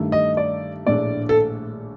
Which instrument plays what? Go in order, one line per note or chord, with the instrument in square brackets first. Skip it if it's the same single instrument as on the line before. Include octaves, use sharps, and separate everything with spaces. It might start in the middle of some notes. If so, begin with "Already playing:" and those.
Already playing: [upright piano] G2 D#3 A3
[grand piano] D#5
D5
[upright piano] A#1 A2 A3 D4 [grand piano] D5
[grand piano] A4